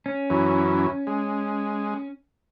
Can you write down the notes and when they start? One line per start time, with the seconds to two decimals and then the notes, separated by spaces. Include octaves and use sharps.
0.06 C#4
0.30 F#2 E3
1.07 G#3